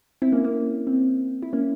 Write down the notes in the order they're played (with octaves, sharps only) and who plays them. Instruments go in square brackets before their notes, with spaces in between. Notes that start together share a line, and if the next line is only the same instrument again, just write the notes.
[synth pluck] C4 E4
A#3 C#4
A#3
C4
E4
A#3 C#4